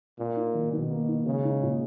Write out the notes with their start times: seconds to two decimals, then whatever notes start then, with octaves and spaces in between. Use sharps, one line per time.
0.19 A#2 A#3
0.36 D#4
0.54 D#3
0.72 B2 D#3
0.91 A#3
1.08 D#4
1.26 C#3 G#3
1.44 D#4
1.62 A#2